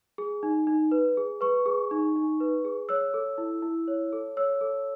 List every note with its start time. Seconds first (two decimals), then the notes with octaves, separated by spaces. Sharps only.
0.18 G#4
0.43 D#4
0.67 D#4
0.91 B4
1.17 G#4
1.41 B4 C#6
1.66 G#4
1.91 D#4
2.16 D#4
2.40 B4
2.65 G#4
2.89 C#5 E6
3.14 A4
3.38 E4
3.62 E4
3.88 C#5
4.13 A4
4.37 C#5 E6
4.61 A4